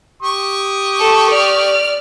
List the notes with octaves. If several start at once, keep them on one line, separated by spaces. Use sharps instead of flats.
G4 C#6 D#6
A4
D5 F6